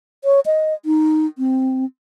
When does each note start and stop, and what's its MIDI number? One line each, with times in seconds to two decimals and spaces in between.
0.24 0.40 73
0.46 0.74 75
0.85 1.26 63
1.38 1.85 60